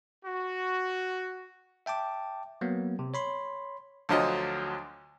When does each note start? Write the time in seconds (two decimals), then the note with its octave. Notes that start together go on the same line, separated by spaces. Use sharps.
0.25 F#4
1.86 E5 G5 A5 D6
2.61 F#3 A#3 B3
2.99 C3
3.14 C#5 B5 C6
4.09 D2 D3 F3 F#3 D#5